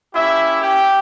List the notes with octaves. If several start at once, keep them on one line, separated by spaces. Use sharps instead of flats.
A#3 C#4 E4 G4 E5
G4 G5